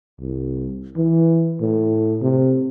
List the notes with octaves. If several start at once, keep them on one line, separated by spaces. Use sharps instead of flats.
C2
E3
A2
C3